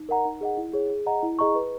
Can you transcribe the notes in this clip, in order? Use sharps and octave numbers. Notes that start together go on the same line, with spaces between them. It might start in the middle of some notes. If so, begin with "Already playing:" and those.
Already playing: D#4
A#4 D#5 F#5 A#5
D#4
G#4 D#5 F#5
E4
G#4 C#5
G#4
D#5 F#5 A#5
E4
G#4 D#5 A#5 C#6
B4